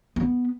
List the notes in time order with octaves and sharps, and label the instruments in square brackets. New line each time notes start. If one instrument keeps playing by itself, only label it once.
[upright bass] B3